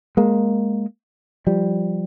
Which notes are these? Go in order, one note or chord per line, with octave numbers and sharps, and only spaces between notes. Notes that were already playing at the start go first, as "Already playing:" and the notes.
G#3 A#3
F3 G3